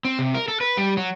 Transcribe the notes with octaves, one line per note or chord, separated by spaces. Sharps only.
C4
C3
A#4
A4
B4
G3
F#3